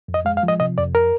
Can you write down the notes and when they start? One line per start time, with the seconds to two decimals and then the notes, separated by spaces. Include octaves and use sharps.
0.08 F2
0.14 D#5
0.25 G#3 F5
0.37 F5
0.43 F3
0.48 D#5
0.60 C3 D#5
0.78 F2 D5
0.95 A#4